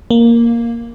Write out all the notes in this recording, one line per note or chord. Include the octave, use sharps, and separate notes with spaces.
A#3